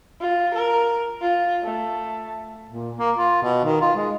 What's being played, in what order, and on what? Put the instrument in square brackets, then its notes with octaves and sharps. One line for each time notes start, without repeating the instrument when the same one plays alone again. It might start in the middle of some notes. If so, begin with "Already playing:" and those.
[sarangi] F4
A#4
F4
A3
[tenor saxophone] A#2
A#3
F4
B2
D#3
F4
G#3